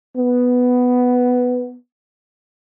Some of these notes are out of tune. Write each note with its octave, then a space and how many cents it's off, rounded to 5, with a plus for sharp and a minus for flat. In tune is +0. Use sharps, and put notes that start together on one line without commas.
B3 +5